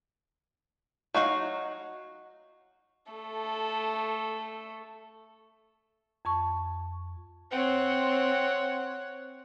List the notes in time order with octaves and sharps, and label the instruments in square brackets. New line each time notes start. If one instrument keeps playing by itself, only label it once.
[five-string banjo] F#3 D#4 F#4 F5
[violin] A3 A4
[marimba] F2 A5 C#6
[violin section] C4 [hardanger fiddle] C#5 F#5